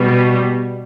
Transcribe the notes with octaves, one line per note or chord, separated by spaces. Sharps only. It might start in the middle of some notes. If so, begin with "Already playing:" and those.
Already playing: B2 G3